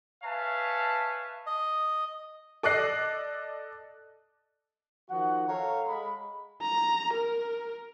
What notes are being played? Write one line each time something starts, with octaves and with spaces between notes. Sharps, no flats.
B4 C#5 E5 F5 G#5 A5
D#5
A4 D5 D#5 F#6 C7
D#3 F3 F#4 F#5
A4 C#5 F5 F#5 A#5
G#3 B5
A#5
A#4